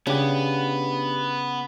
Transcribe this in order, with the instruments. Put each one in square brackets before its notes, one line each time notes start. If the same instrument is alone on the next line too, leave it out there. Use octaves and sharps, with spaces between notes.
[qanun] C#3 G#5 [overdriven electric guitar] B3 [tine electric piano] D4 G4